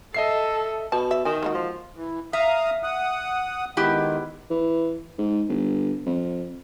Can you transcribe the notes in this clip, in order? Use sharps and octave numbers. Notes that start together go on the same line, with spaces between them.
A4 D#5 E5 C7
B2 A5
D5 E5
D#3 G#5
G#3 A#3 F#4
F3
E3
E5 F5 A#5 D#6
F#5 D#6
D#3 G#3 B3 E4 G4
E3
G#2
G1
F2